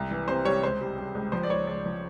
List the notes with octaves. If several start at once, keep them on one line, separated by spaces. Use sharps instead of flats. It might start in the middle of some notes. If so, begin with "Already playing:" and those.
Already playing: C2
E3
C3 C5
G3 C#5
C#2 C5
G3
G3
C#2
F3 C5
D5
C#2 C#5
C#2 D5
F3